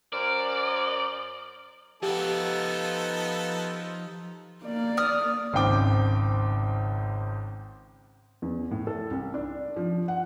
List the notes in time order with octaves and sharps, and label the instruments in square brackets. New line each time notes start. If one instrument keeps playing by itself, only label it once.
[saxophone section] F#2 A#4 C5 [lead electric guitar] D5
[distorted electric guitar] F3 F#5 [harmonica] B3 A4 [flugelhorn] D#4 [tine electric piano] G4
[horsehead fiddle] A#3 D5
[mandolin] D#6 F6
[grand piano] G#1 C#2 C4 G5 D6
[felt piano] E2
A2
A4
C2
D4
F3
F#5